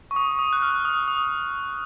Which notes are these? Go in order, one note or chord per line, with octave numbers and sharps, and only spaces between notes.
C#6
D#6
C#6
D#6
F#6
F6
D#6
D#6